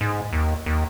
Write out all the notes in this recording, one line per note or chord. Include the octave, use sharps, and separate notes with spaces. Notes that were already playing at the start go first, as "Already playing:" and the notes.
G#2
D#2
D#2